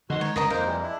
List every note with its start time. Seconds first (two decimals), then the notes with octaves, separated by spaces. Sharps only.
0.10 D3 D#3 F#4 D#5 C6
0.21 G#3 D#4 C#5
0.36 G1 C#2 A#4 D#5 A#5
0.50 F2 A#3 D#4 A#4 C5 D#5
0.66 E3 G3 G#3
0.83 D4 E4 A5